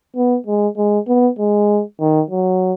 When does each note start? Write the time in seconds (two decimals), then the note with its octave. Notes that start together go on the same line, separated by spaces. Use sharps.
0.16 B3
0.46 G#3
0.77 G#3
1.08 B3
1.39 G#3
2.00 D#3
2.30 F#3